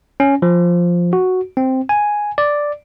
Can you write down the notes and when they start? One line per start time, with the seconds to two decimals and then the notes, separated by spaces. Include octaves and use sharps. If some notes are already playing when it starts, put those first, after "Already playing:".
0.20 C#4
0.42 F3
1.13 F#4
1.57 C4
1.89 G#5
2.38 D5